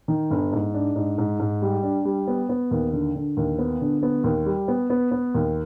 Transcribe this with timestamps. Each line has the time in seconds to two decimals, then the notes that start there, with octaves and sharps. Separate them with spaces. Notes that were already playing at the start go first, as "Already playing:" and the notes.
0.08 D#3
0.31 G1
0.52 G#2
0.74 D4
0.95 G#2
1.18 G#2
1.40 G#2
1.62 G3
1.83 D4
2.05 G3
2.27 B3
2.49 B3
2.71 D#2
2.93 D3
3.15 D3
3.37 D#2
3.59 B3
3.81 D3
4.03 B3
4.24 D#2
4.46 G3
4.68 B3
4.90 B3
5.12 B3
5.35 D#2